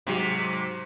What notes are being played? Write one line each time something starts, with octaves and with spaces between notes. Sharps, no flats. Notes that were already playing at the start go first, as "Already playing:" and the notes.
G#2 C3 F#3